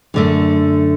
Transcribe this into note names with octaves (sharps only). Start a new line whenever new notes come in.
F#2 D3 A3